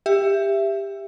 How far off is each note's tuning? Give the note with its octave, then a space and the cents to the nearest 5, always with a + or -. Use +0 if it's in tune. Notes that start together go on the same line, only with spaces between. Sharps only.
G4 +15 E5 +15